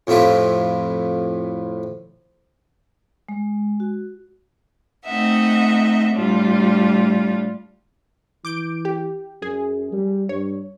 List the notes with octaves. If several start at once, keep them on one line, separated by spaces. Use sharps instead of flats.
F2 A2 E4 F4 G4
G#3
F#4
A3 C4 D#4 D#5 E5 F#5
A2 G3 D4 F4
E3 D6 G6 D7
G4
F#2 G#4
G3
G2 C#5